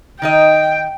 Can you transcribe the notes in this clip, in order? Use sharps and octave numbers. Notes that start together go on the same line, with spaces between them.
D#3 D#4 D#5 G5